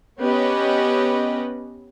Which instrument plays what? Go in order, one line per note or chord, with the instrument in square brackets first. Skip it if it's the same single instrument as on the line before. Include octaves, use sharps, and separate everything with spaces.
[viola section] B3 C#4 G4 B4 D#5